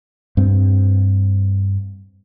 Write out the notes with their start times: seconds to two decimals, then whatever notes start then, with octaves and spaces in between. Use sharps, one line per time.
0.37 G2 C4